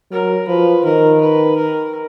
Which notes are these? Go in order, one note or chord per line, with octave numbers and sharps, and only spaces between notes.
F#3 A#4
F3 B4
D#3 A#4
B4
A#4